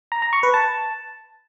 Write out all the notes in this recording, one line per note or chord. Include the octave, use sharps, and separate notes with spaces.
A#5
A#5
C#6
B4
A5